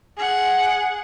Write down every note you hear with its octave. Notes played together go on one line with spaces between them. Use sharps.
G#4 F#5